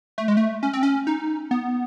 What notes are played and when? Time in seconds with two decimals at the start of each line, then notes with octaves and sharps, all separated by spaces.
0.18 A3
0.28 G#3
0.37 A3
0.63 C#4
0.73 C4
0.83 C#4
1.07 D#4
1.51 B3